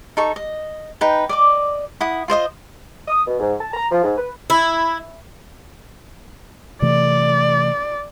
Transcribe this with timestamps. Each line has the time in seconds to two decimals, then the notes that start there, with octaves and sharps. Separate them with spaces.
0.17 D#4 A4 C#6
0.36 D#5
1.01 D#4 B4 G5
1.29 D5 D#5 D6
2.01 E4 F#5 D#6
2.28 F4 C5 D#5 D#6
3.08 D#6
3.27 B2
3.40 G#2
3.61 A5
3.74 A#5
3.91 F3
4.04 G#2
4.18 B4
4.50 E4
6.82 C3 E3 A3 D5